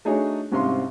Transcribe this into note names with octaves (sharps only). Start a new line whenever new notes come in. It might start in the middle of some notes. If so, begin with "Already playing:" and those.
A3 D4 D#4 F#4 G#4 C#5
C2 G#2 C3 C#4 F5 C6